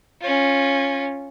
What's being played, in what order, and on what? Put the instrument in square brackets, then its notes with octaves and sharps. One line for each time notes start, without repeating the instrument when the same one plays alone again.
[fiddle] C#4 F4